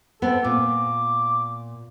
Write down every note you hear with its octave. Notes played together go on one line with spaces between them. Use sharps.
B3 C4 A4
A#2 D6